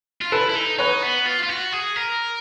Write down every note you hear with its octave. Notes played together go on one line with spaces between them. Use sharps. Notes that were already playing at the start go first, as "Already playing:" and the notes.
F4
E4 A4 B4
E4
D#4
D#4 B4 C#5
B3
F4
F4
F#4
G#4
A#4